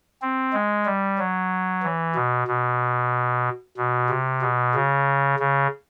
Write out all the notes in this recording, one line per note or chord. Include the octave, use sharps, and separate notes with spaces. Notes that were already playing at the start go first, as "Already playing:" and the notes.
C4
G#3
G3
F#3
E3
B2
B2
B2
C3
B2
C#3
C#3